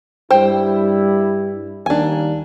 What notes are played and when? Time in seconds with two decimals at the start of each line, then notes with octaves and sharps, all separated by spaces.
0.31 G2 G3 E4 C5 G5
1.86 D#2 G3 A#3 D4 G#5